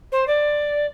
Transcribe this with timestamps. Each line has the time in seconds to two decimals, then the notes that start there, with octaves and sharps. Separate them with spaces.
0.12 C5
0.27 D5